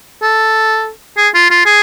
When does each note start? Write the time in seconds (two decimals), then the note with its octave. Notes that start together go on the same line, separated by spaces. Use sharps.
0.22 A4
1.17 G#4
1.34 F4
1.51 F4
1.66 G#4